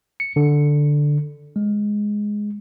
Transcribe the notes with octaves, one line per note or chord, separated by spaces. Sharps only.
C#7
D3
G#3